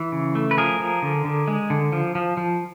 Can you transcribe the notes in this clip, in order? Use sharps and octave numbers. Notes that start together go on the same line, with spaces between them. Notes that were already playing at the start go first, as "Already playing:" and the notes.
Already playing: E3
C#3
A3
B4
F3 G#4 A#4
F3
D3
D3
G#3
D3
F3
F3
F3